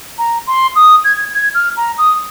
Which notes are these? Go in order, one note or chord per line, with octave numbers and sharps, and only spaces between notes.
A#5
C6
D#6
G#6
G#6
F6
A#5
D#6